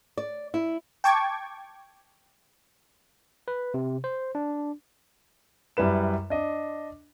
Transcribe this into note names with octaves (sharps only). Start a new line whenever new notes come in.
D5
E4
G5 A5 C#6 D6 G#6
B4
C3
C5
D4
F#2 G3 E4 B4 E7
D4 D#5